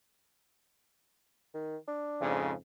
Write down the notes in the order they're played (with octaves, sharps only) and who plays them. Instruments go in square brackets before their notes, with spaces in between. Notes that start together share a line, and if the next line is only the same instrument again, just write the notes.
[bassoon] D#3
D4
[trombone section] F2 G#2 C#3